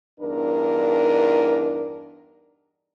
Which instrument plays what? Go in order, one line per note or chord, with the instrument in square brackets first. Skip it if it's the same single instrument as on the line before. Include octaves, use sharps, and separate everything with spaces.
[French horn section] E2 G2 D4 D#4 A#4